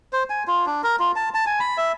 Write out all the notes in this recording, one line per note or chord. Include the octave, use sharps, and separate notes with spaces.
C5
G#5
F4
D4
A#4
F4
A5
A5
G#5
B5
E5